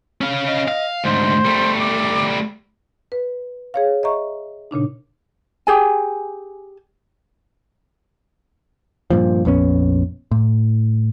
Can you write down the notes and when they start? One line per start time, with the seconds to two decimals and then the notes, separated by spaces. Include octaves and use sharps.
0.21 C#4 F5
0.47 D#5
0.68 F5
1.04 D2 G#2 C5
1.46 G3 A3
1.79 D6
3.12 B4
3.74 G#4 C#5 F5
4.03 D#5 E5 A#5 C#6
4.71 A#2 C#3 D4 D#4
5.67 G4 G#4 G#5
9.10 G2 A#2 F3
9.45 A#1 F2 B3 C#4
10.31 A2